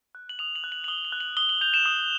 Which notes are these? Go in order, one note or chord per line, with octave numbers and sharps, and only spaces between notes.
F#6
F#7
D#6 F7
F#7
F#6
F#7
F#7
D#6 G7
F#7
F#6
F#7
D#6 G7
F#7
G6 F7
E7
D#6